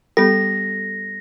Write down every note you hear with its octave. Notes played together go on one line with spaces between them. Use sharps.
G3 B3 G4 A4 A#6